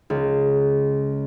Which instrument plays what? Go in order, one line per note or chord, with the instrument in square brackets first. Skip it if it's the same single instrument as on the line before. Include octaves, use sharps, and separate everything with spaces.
[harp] C#2